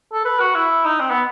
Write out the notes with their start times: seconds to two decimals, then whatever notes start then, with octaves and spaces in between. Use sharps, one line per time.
0.13 A4
0.25 B4
0.40 F#4
0.55 E4
0.85 D#4
1.00 C4
1.10 B3